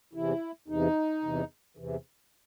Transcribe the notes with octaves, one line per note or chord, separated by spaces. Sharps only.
E2 C3 E3 E4
E2 C3 E3 D#4
E2 C3 E3
E2 C3 E3